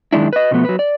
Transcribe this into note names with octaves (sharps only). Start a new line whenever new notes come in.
F#2 D#3 G#3 D4 E4
B4 D#5
B2 D3 F3 A3 B3
F#3 B4
D5